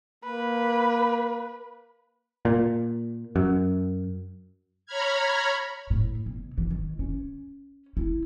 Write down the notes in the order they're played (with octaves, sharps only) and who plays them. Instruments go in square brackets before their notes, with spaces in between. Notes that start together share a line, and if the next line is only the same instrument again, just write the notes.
[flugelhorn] A#3 [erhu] B4
[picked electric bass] A#2
F#2
[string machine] C#5 A#5 B5 F6 G#6
[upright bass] A2
B2
E3
D#3
C#4
E4